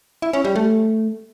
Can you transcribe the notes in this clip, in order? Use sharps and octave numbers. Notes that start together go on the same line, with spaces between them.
E4
C#4
G3
A3